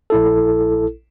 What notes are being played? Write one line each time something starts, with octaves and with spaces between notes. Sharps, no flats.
A#1 E4 A4